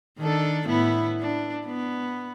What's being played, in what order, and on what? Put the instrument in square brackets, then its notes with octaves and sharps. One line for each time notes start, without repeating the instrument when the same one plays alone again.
[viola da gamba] D#3 D4 A4
A2 B3 E4
D4
B3